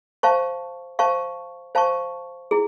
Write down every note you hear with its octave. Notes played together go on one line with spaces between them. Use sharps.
C5 F5 A5 C#6
C5 F5 A5 C#6
C5 F5 A5 C#6
E4 G#4